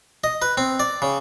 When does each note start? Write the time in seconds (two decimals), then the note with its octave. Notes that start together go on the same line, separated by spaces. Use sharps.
0.24 D#5
0.42 B4
0.58 C4
0.80 D5
1.02 C#3